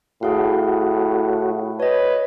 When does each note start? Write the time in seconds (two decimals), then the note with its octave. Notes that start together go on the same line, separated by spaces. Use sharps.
0.23 A2 F#4 G#4 F5
1.80 B4 C#5 D#5